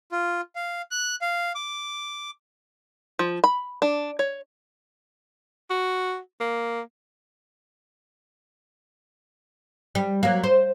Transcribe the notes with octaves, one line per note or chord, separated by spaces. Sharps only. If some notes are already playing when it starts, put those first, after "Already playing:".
F4
F5
F#6
F5
D6
F3
B5
D4
C#5
F#4
A#3
G3
F#3 A#3
C5